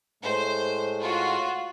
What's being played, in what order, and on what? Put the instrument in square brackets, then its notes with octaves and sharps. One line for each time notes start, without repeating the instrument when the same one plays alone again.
[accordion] A2 G#3 A3 [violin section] C5
[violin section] F4 F#4